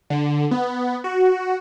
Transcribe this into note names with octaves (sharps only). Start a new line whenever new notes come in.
D3
B3
F#4